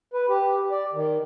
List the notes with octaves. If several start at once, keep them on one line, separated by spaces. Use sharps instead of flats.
B4
G4
D5
D#3